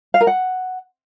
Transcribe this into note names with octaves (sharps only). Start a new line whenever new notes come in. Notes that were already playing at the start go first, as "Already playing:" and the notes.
F5
A#4
F#5